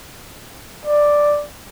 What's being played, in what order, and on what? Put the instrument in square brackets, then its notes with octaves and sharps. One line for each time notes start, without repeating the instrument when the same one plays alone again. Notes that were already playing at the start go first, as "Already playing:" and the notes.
[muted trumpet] D5